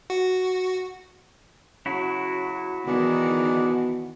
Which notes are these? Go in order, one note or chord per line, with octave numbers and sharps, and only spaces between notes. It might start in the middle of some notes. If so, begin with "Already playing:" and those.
F#4
C#3 F#3 E4 F#4
B2 D#3 E3 G#4 D5 F#5